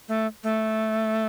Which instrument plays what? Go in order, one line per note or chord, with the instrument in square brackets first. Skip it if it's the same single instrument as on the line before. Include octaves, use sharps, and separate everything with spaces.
[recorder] A3
A3